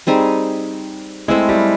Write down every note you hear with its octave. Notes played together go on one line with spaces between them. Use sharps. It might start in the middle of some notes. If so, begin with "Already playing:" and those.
G3 C4 D#4 G#4
G#3 A3 C4 E4
G3